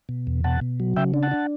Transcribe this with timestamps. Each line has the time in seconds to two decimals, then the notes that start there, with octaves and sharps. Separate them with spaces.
0.09 B2
0.27 E2
0.44 B2 F#5 A5
0.61 B2
0.80 F#3
0.96 C#3 E5 G5
1.14 D4
1.23 F#5 A5
1.31 D4